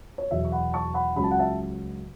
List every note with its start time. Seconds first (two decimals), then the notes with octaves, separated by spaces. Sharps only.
0.18 C#5
0.31 E2 B2 F#3 E5
0.45 C#6
0.52 F#5 B5
0.73 A5 C#6
0.94 F#5 B5
1.16 C#2 C#3 F#3 B5
1.24 A5
1.31 F#5
1.39 E5 A5